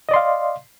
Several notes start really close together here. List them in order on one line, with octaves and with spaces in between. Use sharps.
D#5 D5 C6 F5